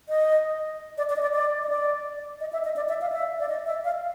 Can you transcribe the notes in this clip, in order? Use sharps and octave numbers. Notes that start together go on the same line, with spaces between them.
D#5
D5
D5
D#5
D5
D5
D#5
D5
D#5
E5
D#5
D5
E5
F5
E5
D5
D#5
E5
F5